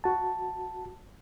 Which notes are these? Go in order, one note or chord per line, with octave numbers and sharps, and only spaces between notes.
F#4 A5